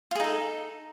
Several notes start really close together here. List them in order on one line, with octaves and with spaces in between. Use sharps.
F4 G#4 D#4 A4